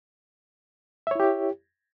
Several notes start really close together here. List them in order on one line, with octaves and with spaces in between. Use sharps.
E5 C#5 E4 G4